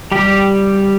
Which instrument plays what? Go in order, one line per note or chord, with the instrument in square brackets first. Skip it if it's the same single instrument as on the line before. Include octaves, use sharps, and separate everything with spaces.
[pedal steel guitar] G3 G4